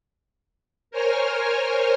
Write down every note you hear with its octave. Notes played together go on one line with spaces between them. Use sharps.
A#4 C5 C#5 G#5 F6